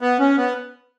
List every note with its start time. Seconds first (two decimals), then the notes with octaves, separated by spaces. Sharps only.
0.01 B3
0.20 C#4
0.37 B3